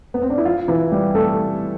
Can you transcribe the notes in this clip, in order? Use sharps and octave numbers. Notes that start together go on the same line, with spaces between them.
B3
C4
D4
E4
F3 F4
E3 E4
G3 G4
A3 A4